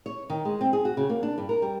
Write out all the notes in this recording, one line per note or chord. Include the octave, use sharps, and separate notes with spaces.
C#5
D#3
G#3
C4
G#4
F#4
C#3
A#3
D4
G2
A#4
G3